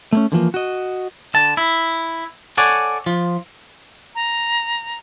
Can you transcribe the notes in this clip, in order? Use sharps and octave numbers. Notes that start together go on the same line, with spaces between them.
A3 A#3 C#4
D3 E3 F3 A#3
F#4 D#5
D3 A5
E4
A4 C#5 D5 F#5 G#5
F3 F4
A#5